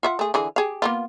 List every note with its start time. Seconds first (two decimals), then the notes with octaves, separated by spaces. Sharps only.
0.03 F4 E5 F#5
0.19 A3 G#4
0.34 D3 E3 G#4
0.56 G4 G#4 F5
0.82 A#3 B3 F4